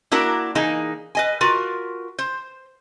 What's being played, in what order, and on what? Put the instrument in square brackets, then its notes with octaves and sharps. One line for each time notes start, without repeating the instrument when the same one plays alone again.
[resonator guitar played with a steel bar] A#3 D4 E4 F#4 A#4
E3 A#3 D#4 G#4
B4 D#5 G#5
F4 F#4 A#4 B4
C5